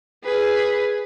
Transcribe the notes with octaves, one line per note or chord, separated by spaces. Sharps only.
G#4 B4